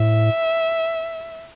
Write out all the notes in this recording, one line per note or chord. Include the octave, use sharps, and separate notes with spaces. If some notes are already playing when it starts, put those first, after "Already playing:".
Already playing: A2 E5